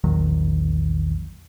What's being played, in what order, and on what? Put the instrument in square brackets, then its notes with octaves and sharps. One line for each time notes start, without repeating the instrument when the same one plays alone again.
[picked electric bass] A#1 E2 D#3 F#3